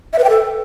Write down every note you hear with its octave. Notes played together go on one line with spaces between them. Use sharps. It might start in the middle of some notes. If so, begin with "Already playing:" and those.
E5
B4
G5
A4